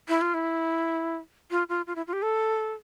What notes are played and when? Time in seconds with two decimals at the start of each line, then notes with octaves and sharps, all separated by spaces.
0.09 E4
0.21 F4
0.34 E4
1.51 F4
1.69 F4
1.87 F4
1.96 E4
2.07 F4
2.13 G4
2.22 A4